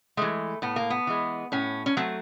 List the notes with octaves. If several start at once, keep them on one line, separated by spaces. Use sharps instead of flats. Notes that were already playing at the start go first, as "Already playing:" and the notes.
E3 G#3 A3
A2 B3
A#3
B3
E3 G#3
A2 C#4
C#4
F#3 A3 C4